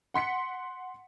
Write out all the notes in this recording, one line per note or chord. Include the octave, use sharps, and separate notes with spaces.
F#5 C6 B6 C#7